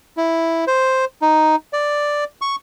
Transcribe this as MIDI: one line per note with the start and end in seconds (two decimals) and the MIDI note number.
0.17 0.65 64
0.67 1.05 72
1.22 1.56 63
1.73 2.24 74
2.42 2.56 85